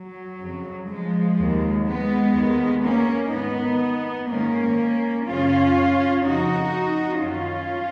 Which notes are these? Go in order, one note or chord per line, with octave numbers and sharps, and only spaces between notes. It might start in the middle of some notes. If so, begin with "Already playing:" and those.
Already playing: F#3
F2 C#3
F3 G#3
D#2 D#3
G#3 B3
D#2 D#3
A#3 C#4
G#2 D#3 B3 D#4
G#2 D#3 A#3 C#4
F#2 C#3 C#4 F4
F2 C#3 D#4 F#4
F#2 D#3 C#4 F4